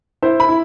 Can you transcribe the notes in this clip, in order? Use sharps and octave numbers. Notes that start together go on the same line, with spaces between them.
E4 C5
B5
E4